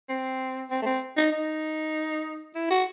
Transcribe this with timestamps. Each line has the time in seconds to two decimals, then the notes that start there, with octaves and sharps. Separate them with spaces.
0.09 C4
0.71 C4
0.82 A3
0.86 C4
1.17 D#4
1.32 D#4
2.55 E4
2.70 F#4